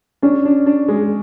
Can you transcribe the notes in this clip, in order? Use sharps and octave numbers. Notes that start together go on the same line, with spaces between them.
C#4 D4
D4
D4
G#3